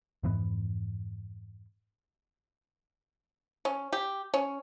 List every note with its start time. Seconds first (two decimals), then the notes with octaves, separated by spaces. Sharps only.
0.23 F2 G#2 E3 B3
3.65 C#4
3.93 G4
4.34 C#4